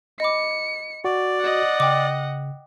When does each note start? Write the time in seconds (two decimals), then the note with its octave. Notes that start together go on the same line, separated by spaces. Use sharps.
0.20 D#5 B5 D6 C#7
1.04 F#4 D5
1.41 D#5 F#5
1.80 C#3 G5 D6